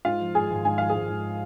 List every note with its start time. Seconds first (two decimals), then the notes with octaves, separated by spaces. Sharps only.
0.05 G#2 F4 F5
0.20 F3
0.35 G#1 G#4 G#5
0.50 G#1
0.65 G#2 G#5
0.78 F3 F5
0.89 G#4 G#5
0.95 G#1
1.10 G#1